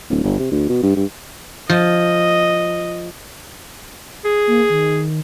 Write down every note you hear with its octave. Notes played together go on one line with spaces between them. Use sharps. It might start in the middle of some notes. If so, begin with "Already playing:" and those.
D1
G1
C3
D2
B2
G2
G2
F3 D#5
G#4
A#3
D#3